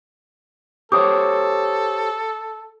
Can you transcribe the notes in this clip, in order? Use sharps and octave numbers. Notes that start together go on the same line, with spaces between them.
G4 A4 C5 C#5 D6 D#6